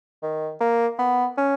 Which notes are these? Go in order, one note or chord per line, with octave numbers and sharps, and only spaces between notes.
D#3
A#3
B3
C#4